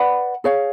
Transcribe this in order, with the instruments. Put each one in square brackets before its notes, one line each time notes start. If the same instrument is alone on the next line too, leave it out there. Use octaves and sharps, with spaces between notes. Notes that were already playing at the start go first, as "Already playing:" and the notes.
Already playing: [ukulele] B4 D5 F#5 B5
G#4 C#5 F5